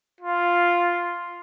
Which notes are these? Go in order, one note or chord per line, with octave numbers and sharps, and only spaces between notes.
F4